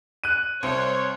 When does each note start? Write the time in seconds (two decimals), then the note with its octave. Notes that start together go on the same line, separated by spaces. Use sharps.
0.24 F#6 D#7
0.63 C2 C5 C#5